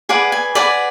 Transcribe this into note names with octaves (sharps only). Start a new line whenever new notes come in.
G#4 B4 D5 F#5
G#5
G#4 B4 D5 F#5